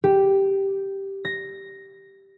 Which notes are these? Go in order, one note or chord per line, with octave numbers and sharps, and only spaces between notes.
G4
A#6